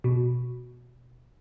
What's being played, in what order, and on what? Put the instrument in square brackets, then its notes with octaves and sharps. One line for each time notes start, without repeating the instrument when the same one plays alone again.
[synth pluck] B2